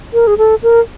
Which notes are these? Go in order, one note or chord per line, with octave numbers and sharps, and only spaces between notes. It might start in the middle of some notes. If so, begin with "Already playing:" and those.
A#4
G#4
A4
A#4